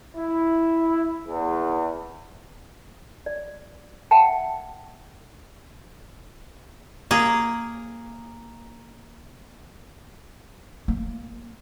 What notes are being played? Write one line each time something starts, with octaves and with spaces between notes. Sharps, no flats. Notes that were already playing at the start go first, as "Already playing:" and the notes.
E4
E2
D5
E5 F#5 G5 A5
A#3 G#4
A#3